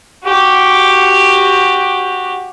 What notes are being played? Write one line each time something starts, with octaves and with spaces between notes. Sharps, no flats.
F#4 G4